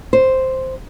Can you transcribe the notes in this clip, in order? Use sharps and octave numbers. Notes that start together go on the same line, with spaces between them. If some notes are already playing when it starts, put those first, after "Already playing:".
C5